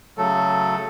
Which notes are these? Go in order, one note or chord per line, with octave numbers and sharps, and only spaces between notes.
C#3 F#3 A3 A4